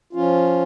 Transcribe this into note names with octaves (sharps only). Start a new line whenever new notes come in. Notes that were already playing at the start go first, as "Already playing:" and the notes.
F3 C#4 F4